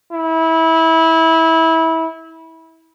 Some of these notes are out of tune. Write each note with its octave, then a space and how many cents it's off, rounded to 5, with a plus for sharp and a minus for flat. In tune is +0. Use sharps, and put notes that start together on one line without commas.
E4 -20